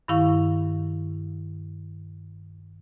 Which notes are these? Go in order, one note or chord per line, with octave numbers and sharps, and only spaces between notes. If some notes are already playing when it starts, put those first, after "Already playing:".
G2 D#3 E4 F5 C#6